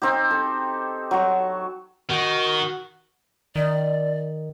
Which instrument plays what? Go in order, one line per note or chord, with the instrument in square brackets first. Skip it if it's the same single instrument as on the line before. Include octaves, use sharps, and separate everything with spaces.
[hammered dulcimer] C4 D#4 G4
A4
F#3 C#6
[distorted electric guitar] D#3 [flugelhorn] F#4
[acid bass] D#3 [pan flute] D5